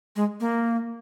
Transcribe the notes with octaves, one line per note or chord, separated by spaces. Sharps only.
G#3
A#3